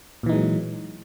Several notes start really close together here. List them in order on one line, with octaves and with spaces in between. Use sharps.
A#2 E3 D#4 G#3 F#3